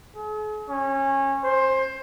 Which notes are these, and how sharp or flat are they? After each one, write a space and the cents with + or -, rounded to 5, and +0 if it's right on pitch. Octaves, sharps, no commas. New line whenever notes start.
G#4 +45
C#4 -25
C5 +15